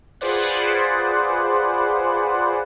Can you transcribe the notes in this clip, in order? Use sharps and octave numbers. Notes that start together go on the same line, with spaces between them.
F4 G#4 B4 C5 D5 F#5